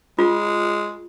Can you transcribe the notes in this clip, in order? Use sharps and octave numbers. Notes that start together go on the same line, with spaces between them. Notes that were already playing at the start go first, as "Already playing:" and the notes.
G#3 F4